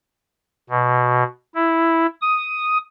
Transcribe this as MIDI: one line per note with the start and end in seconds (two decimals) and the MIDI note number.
0.70 1.24 47
1.55 2.06 64
2.22 2.78 87